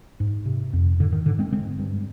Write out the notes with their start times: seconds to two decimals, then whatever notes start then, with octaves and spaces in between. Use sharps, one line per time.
0.20 G#2
0.46 C3
0.73 F2
1.00 G#2 D3
1.13 D#3
1.26 G#2 D3
1.39 G#3 C4
1.52 D3 G#3 C4
1.79 G2